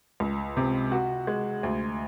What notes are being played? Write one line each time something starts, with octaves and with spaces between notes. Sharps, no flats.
C#2
C3
F#4
G#3
D2